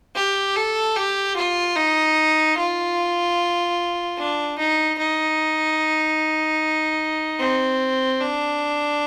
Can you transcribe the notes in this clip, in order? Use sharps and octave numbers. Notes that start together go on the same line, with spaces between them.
G4
A4
G4
F4
D#4
F4
D4
D#4
D#4
C4
D4